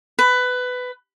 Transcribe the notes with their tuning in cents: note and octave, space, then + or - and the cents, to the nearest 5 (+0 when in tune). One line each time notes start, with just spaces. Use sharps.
B4 +15